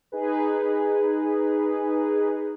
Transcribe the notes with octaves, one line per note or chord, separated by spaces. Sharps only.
D#4 G#4 B4